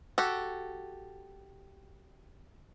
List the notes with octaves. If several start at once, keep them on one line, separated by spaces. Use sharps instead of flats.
F#4 G4 A4